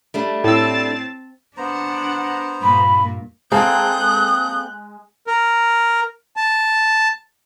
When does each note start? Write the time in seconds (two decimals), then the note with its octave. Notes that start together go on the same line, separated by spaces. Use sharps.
0.14 G3 A3 D4
0.44 A2 C4 A5 E6
1.57 B3 D4 C5 F#5 A#5
2.62 G2 A#2 B5
3.52 G#3 A#3 C4 A4 D#6 F#6 G6
5.27 A#4
6.36 A5